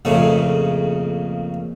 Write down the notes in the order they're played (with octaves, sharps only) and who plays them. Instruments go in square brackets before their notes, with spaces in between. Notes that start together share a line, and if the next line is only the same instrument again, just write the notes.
[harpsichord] F2 A#2 C#3 A3